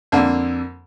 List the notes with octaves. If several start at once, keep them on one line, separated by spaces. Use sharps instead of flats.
F2 D3 A#3